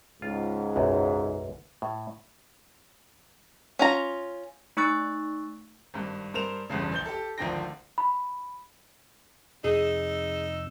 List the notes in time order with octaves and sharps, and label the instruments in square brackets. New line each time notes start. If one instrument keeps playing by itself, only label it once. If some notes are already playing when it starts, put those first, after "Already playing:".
[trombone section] C#2 G#2 [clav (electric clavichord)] F4
[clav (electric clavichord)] B1 F#2
A2
[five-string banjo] C#4 F4 A#5
[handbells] A3 D#4 C#6 E6 F#6 A6
[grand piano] G#1 G2
G2 A#4 C5 E7 F7
G1 E2 G2 C#3
A#1 G6 G7
G4 A4
G#1 D2 F3 D4 G5 A#6
[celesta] B5
[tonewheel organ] F2 C3 E6 [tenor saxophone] D#4 [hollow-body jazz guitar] G#4